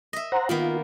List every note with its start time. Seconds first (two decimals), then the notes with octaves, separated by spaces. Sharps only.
0.13 D#5 E5
0.32 C5 F#5 A#5
0.49 D#3 A#3 B3 F4